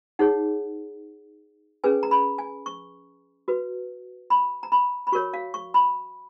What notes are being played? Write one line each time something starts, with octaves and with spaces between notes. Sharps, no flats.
D#4 G#4 C#5 F#5
C#4 G#4 B4 G#5
A#5
B5
G#5
C#6
F#4 B4
B5
A#5
B5
B5
F#4 A#4 C#5 C#6
F5
C#6
B5